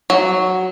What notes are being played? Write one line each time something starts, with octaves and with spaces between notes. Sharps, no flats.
F#3